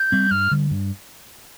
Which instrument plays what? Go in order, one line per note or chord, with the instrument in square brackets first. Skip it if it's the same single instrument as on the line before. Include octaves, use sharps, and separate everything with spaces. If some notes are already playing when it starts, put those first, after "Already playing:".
Already playing: [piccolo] G6
[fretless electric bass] G3 C4
[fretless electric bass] G2 [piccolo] F6
[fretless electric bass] D3 G3
G2